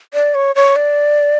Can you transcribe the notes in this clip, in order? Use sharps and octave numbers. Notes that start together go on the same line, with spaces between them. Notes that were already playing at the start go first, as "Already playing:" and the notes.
D5
C#5
C#5
D5